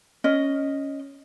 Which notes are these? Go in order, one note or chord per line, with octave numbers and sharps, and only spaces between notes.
C#4 D#5